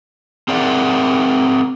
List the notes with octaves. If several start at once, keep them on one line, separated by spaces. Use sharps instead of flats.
C4 G#4 A#4 D5 E5 F#5